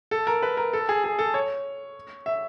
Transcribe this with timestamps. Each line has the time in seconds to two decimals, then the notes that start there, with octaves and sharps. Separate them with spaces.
0.11 A4
0.27 A#4
0.42 B4
0.57 A#4
0.73 A4
0.89 G#4
1.04 G#4
1.19 A4
1.34 C#5
2.26 E5